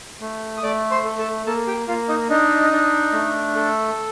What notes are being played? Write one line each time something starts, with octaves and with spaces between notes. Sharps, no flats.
A3
D#6
A3 D5 D6
C5 C6
A4
A4 A5
A#3 A4 A5
G4 G5
A#3 F4 F5
D#4 D#5
D4 D#4 D#5
D4
A3
A4